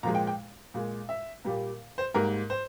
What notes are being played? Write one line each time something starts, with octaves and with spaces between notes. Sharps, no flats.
A#2 F3 G#3 A#5
G5
G5
A#2 G#3
E5
A#2 G3 A#3
C5
G#2 G3 A#3 A#4
C5